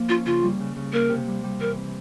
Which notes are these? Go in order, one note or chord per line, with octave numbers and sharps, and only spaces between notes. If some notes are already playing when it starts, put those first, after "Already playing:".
Already playing: F3 A#3
C#4 F4
C#3 F4
G3
C#3
C#3
A#3 A#4
C3
G3
G3
E3 A#4
C4